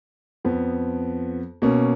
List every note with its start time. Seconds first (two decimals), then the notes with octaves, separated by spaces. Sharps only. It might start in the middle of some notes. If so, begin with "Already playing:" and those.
0.45 F2 F3 B3
1.62 B2 A#3 C#4